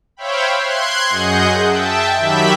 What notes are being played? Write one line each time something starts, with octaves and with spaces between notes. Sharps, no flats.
C5 C#5 E5 F5 G5 B5
C6 F#6 G#6
F#2 G#4 D#5 F#5 G6
E5 G5 A5
D#3 F#3 G4 E5 B5 B6